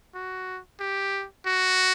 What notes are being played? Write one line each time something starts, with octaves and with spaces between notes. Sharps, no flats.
F#4
G4
F#4